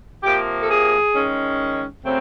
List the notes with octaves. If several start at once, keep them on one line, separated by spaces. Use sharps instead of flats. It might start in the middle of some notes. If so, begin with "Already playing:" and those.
C3 F3 A#3 G4
A4
G#4
D#3 G#3 C#4
C#3 F#3 A3 C4